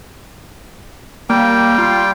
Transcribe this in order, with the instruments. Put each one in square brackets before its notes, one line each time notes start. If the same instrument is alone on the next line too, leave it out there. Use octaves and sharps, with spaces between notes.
[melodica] G3 G5 [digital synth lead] A#3
[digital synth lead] F4